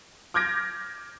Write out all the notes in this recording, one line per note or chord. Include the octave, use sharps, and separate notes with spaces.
D6 F6 G6 G#6 A#6 D7